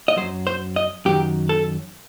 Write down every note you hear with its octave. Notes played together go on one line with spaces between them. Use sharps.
D#5
F#2 F#3 C5
C5
D#5
F#2 D#3 F#3 G4
A4